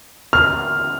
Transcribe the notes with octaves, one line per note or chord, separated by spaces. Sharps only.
F6